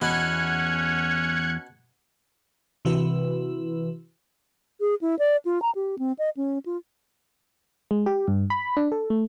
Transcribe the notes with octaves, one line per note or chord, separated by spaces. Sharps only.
E2 B2 B3 C#4 F#6 G#6 C#7
C3 E3 E4 F#4 B4
G#4
E4
D5
F4
A#5
G4
C4
D#5
C#4
F4
G#3
G4
G2
B5
D4
A4
A3